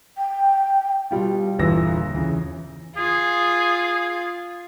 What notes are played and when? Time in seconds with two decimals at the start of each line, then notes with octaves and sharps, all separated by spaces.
0.17 G5
1.11 B2 G3 F4
1.59 G1 E2 A#2 E3 E6 A#6
2.14 E2 C#3
2.97 F4 G#4